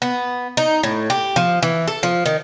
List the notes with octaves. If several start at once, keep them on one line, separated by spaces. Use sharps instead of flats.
B3
D#4
A2
G4
F3
E3
A4
F3
D#3